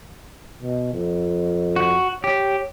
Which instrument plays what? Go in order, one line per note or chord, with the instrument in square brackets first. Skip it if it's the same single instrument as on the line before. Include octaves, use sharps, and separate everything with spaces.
[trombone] B2
F2
[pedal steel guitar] F#4
[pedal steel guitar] G4 [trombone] C#5